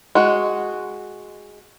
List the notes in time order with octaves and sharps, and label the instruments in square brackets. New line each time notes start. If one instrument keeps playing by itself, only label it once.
[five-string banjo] G#3 F#4